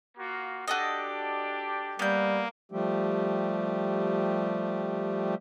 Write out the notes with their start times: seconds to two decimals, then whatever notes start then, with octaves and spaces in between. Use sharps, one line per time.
0.18 A#3 F4 F#4
0.68 D4 F#4 G4 A4 D#5
1.99 G3 A#3 B3 G6
2.72 F3 G3 A3 G4